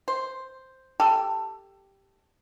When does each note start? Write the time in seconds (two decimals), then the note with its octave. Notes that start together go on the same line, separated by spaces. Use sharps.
0.08 C5
1.00 G4 A4